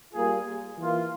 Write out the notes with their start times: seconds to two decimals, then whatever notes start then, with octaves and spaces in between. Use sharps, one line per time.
0.13 G3 A#3 F4 G#4
0.78 E3 A#3 F4